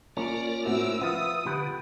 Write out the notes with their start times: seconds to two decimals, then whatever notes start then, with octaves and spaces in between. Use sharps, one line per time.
0.17 A#3 C#4 F4 A#4 D5
0.65 A2 C4 F#4 E6
1.01 F3 B3 F4 B4 E5 D#6
1.46 D3 B3 G4 B4